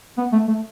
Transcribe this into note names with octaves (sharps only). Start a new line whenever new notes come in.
B3
A3
A3